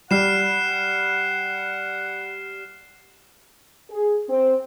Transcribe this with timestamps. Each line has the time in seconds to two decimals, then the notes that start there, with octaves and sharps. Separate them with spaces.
0.11 G3 F#5 F6 C7 E7
3.91 G#4
4.29 C4